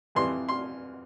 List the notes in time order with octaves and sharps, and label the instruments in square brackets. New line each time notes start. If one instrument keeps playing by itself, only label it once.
[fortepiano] F2 E3 G3 C6
C6